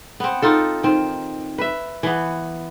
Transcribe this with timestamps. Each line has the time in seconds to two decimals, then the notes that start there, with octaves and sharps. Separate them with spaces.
0.20 B3 C4
0.42 C4 D#4 F4 A4
0.83 D#3 C4
1.58 B4 E5
2.03 E3 B3